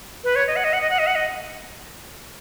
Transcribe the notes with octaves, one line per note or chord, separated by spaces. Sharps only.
B4
C#5
D#5
F#5
D#5
F#5
D#5
F#5
D#5
F#5
D#5